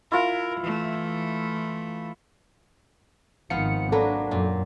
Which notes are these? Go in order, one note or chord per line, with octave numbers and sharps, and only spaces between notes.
E4 F4 A#4
E3 A3
G#1 D#3 F3 B3 F5 C#7
F#3 A#3 D4 A4 B4
F#2 A#2